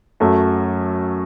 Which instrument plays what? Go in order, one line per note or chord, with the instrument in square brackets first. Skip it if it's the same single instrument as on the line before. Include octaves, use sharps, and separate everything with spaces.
[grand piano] F#2 F#3 A3